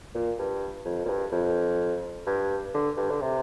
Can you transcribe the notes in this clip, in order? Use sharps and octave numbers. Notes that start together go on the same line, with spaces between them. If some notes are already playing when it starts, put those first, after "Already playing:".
A#2
G2
F2
A#2
G2
F2
G2
D3
G2
D3
C3